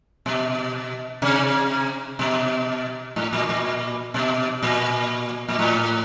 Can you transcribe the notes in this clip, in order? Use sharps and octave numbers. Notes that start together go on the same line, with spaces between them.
B2
C3
B2
A2
A#2
A#2
B2
A#2
A#2
A2